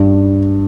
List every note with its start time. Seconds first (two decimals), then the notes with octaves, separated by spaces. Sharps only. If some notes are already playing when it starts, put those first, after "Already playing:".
Already playing: G2